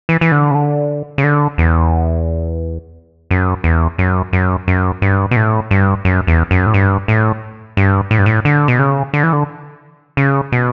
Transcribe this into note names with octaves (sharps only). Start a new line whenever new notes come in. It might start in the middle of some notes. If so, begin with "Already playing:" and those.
E3
E3
D3
C#3
D3
C#3
D3
E2
F#2
E2
F#2
F#2
F#2
G2
B2
A2
G2
F#2
E2
F#2
A2
G2
A2
G2
A2
G2
A2
D3
B2
C#3
D3
E3
D3
C#3
B2